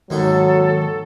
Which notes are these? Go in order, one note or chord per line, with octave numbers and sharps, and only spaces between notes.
D#2 G#2 D#3 F#3 G4 A4